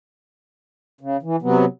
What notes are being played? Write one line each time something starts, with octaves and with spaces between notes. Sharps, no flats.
C#3
E3
C3 F#3 B3